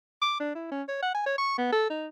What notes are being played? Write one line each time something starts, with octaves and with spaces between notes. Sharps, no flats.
D6
D4
E4
C#4
C#5
F#5
G#5
C#5
C#6
B3
A4
D#4